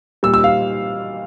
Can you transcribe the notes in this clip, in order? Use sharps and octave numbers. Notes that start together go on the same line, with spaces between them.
A#2 G3 E6
E6
F5